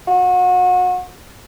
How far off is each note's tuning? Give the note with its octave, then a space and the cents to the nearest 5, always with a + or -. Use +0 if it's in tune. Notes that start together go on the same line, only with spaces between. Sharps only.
F#4 -30